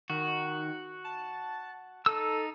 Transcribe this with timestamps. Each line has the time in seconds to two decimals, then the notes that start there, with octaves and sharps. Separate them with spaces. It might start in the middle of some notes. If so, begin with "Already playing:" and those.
0.10 D#3 F#4
1.04 A5
2.06 D#4 A4 E6